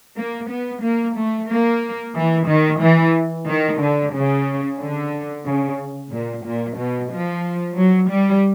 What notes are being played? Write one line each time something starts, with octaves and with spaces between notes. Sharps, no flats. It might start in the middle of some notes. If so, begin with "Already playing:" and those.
A#3
B3
A#3
A3
A#3
E3
D#3
E3
D#3
D3
C#3
D3
C#3
A#2
A#2
B2
F3
F#3
G3